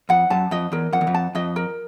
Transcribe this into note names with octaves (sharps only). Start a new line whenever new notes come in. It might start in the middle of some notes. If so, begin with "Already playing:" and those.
F2 F#5
F#2 A5
F2 D#5
E2 A#4
F2 F#5
E2
F2
A5
F2 D#5
A#4